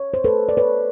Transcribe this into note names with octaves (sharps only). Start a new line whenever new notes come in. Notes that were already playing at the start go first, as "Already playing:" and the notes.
Already playing: C#5
C5
A4 B4
D5
B4 C#5